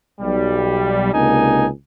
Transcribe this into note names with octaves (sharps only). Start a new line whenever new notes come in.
B1 G3
C#2 C3 A#3 D4 D#4 G#5